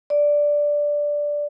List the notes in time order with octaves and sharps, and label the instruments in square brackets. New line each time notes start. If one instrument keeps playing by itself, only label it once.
[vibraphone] D5